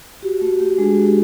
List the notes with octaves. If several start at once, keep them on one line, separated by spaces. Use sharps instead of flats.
F#4 G4
A3 F#4
A3 G4
G#3 D4 G#4
F#4
G4